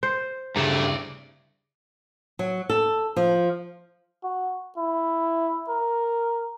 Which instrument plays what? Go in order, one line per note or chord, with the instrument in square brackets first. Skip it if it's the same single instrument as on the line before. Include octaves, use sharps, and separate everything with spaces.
[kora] C5
[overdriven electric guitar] G2 A3 [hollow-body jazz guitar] C#3 G#4 A#5 [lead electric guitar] E4 D5
[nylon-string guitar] F#3
A4
F3
[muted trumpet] F#4
E4
A#4